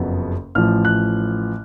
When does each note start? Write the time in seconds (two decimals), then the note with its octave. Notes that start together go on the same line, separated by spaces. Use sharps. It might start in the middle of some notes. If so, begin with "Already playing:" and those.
Already playing: F#1 F2 C#3 F#3 B3
0.55 A1 A2 F3 F6
0.85 F#6